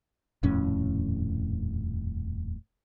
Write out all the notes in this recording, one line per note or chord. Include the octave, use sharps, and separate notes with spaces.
D#1 F2 A2 C#4